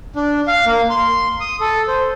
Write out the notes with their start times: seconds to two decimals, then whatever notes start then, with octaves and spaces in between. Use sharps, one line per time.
0.16 D4
0.48 F5
0.66 A#3
0.90 C6
1.41 D#6
1.60 A4
1.88 C5